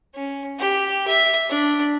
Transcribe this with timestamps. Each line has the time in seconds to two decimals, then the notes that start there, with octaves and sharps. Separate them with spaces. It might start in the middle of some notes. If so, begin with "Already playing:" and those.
0.14 C#4
0.59 G4
1.07 E5
1.49 D4